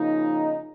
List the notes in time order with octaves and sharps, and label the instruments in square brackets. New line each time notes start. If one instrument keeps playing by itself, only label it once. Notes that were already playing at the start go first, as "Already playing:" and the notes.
Already playing: [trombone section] C#3 F3 A#3 D#4